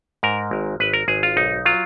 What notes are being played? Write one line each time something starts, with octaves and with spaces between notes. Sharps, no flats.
G#2 A#4
G#1
G#1 B4
A#4
G#1 G#4
F4
B1 D#4
F#3 F4